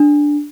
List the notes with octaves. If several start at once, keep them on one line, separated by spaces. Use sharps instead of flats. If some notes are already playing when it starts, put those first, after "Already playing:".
Already playing: D4